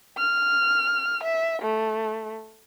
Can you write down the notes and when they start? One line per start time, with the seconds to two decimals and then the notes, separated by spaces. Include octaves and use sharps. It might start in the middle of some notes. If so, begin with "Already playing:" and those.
0.18 F6
1.23 E5
1.62 A3